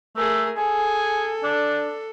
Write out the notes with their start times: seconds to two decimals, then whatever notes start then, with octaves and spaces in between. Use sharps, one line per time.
0.16 A3 G#4 A#4
0.57 G#4 A4
1.43 D4